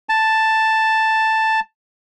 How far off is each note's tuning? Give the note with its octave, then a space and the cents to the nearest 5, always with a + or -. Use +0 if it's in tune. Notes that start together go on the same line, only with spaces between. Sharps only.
A5 +5